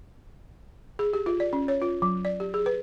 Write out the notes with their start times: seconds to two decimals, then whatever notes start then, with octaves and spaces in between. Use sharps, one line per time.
0.99 G#4
1.13 G4
1.26 F4
1.40 D5
1.53 C#4
1.68 C#5
1.82 F4
2.02 F#3
2.25 D5
2.40 G4
2.54 G#4
2.66 B4